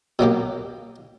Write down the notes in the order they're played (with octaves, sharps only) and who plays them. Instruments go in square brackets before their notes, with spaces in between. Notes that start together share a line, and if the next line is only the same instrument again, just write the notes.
[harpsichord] B2 F#3 A#3 G4